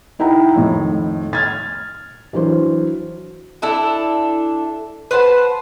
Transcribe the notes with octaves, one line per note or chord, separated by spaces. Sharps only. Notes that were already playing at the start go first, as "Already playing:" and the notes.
D#4 E4 F#5 G5 A#5
F2 A2 D#3
F6 G#6 A6
E3 F#3 D4 C5
D4 E4 A4
B4 C5 F#5 A5